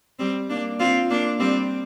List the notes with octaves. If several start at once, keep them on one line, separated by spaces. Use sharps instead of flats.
G3 C4
A#3 D4
C4 F4
A#3 D4
G3 C4